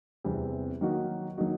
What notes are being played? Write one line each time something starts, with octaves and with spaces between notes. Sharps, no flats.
E2 C3 E3 G3 C4
D#3 F#3 A#3 D#4 F#4
D#3 F#3 A#3 D#4 F#4